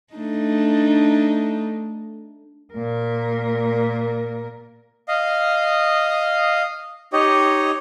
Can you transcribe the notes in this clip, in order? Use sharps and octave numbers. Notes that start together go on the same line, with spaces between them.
A3 D4 D#4
A#2 A#4
D#5 F5
D#4 G4 C#5 D#5